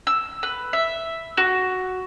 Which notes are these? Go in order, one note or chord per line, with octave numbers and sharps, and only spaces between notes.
E6
B4
E5
F#4